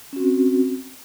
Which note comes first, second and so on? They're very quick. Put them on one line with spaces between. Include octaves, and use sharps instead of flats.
C#4 F#4 C4